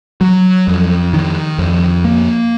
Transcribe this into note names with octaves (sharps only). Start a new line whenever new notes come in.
F#3
F2
D#3
F2
A#3